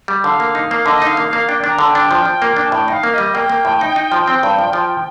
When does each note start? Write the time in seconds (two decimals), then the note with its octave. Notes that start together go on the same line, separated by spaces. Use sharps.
0.08 G3
0.24 D3 F5
0.40 A#3
0.55 D#4
0.71 A#3
0.86 D3 D#5
1.02 D#4
1.07 F5
1.17 A#3
1.27 F5
1.33 A#3
1.48 D4 G5
1.64 D4
1.69 A#5
1.79 D3
1.89 G5
1.95 D4
2.11 F3
2.26 F3
2.42 A#3
2.56 D4
2.66 A5
2.72 A2 G5
2.88 D#4 F5
3.03 A#3
3.14 G3 D#5
3.34 A#3 G5
3.50 A#3
3.65 A2
3.81 D#4
3.96 D#4
4.12 F3
4.27 C4
4.43 G2
4.59 F3
4.73 F3